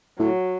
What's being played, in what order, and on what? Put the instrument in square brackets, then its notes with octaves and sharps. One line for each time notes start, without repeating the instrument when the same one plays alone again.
[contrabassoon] A2 [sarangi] F#3